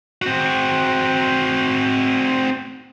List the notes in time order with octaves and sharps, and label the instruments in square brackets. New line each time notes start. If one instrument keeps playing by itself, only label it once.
[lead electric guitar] C4 F#4